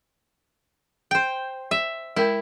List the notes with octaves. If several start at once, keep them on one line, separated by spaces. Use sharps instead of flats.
C5 G5
E5
G#3 E4 A#4 G5